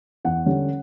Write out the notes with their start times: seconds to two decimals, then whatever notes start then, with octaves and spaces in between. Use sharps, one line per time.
0.25 E2 F#5
0.46 D3 G3 C#4